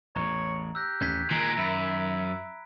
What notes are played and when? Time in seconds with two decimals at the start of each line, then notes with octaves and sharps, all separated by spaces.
0.16 A1 E2 C#5 A#5
0.75 G4 E6 F#6 A#6
1.00 A1 D#2 C#4 F#6 G#6 B6
1.30 A#2 D#3 G#3 A#5 D7
1.57 F#2 E5 A#5 B5 B6